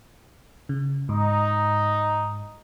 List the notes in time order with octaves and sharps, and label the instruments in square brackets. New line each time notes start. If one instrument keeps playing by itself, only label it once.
[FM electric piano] C#3
[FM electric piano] G#2 [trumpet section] D#4